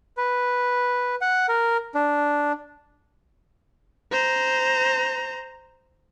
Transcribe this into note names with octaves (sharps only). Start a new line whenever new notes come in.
B4
F#5
A#4
D4
C5 A#5